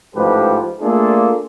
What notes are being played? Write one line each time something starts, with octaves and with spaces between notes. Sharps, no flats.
A1 G#2 F3 G4 A4 B4
A3 A#3 D4 F4 G#4 A4